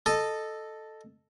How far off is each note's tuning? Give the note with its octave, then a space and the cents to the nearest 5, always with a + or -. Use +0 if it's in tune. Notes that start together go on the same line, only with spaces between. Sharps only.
A4 +0 D#5 -15 A5 +0